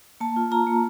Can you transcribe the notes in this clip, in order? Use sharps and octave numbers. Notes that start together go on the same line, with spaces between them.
A#3 A5
F4
F4 A#5
A#3